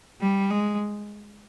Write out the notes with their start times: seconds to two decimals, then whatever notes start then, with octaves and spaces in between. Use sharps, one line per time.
0.21 G3
0.50 G#3